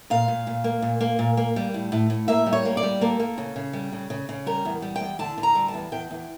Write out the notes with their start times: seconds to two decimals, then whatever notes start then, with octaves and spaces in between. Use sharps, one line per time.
0.10 A#2 F5
0.28 A#2
0.47 A#2
0.64 A#3
0.82 A#2
1.01 A#3
1.19 A#2
1.37 A#3
1.56 G3
1.74 A2
1.92 A2
2.10 A2
2.28 A#3 E5
2.46 G3
2.53 C#5
2.65 A#3
2.77 D5
2.83 G3
3.01 A#3 A4
3.20 A#3
3.38 C#3
3.56 C#3
3.73 G3
3.93 C#3
4.10 C#3
4.29 C#3
4.46 G3 A#4
4.65 E2
4.82 G3
4.96 E2 G5
5.19 D3 A5
5.38 D3
5.43 A#5
5.55 G3
5.68 A5
5.74 E2
5.92 E2 G5
6.11 E2